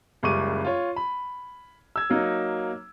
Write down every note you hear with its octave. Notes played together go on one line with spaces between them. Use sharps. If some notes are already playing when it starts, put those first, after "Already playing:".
F#1 C#2 G3 C#6 D6 D#7
F4 C#5
B5
E6 G#6
F#3 A#3 D#4